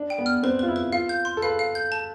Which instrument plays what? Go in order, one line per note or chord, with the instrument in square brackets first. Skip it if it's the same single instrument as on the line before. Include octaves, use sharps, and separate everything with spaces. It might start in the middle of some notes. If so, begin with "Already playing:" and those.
Already playing: [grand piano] D4
[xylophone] G5
[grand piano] B3
[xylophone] F6
[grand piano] C4 [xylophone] B4
[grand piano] F4 [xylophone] B4
[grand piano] E4
[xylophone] B4
[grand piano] F4 [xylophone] F5
[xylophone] G6
C6
[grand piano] A4
[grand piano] B4 [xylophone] F5
[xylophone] F5
G6
A5